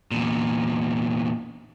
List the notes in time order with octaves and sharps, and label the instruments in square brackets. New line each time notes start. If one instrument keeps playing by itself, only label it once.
[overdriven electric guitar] E2 A#2